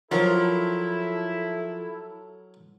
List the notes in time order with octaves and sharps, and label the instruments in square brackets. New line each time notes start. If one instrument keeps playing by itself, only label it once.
[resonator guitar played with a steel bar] F3 [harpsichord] F#3 A#4 [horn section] E4 [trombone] A4